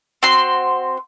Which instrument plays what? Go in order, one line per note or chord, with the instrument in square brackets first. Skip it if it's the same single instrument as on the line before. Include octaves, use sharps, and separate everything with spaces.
[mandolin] C4 F#4 C6